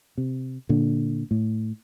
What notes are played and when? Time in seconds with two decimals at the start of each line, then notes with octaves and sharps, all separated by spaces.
0.18 C3
0.69 A#2 D3
1.31 A2